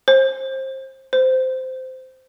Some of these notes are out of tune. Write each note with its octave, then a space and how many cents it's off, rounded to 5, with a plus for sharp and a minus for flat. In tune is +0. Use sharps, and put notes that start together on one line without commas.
C5 +25
C5 -15